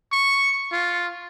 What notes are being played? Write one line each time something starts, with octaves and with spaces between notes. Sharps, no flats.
C#6
F4